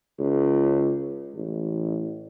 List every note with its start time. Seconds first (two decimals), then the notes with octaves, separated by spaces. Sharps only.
0.19 C#2
1.35 A1